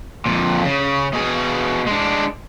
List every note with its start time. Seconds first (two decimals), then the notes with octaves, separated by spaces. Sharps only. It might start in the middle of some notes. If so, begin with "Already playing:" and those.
0.26 F2 A#2
0.64 C#3
1.13 B2 G#4
1.87 G#3 D4